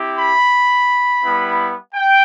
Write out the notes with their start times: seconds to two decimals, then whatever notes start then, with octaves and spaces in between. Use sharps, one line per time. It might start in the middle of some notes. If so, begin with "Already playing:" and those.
Already playing: C4 E4 G4
0.19 B5
1.24 G3 B3 E4
1.94 G5